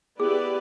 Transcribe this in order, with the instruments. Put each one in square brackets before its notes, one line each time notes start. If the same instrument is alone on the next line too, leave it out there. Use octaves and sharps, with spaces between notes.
[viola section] B3 E4 G4 B4 D5 [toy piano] G#4